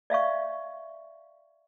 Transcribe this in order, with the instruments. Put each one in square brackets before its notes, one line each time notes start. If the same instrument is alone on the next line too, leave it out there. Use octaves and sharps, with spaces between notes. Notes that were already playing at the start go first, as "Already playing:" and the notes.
[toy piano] D5 E5 F5 C#6